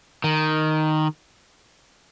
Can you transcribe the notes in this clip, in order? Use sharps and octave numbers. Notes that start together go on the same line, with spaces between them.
D#3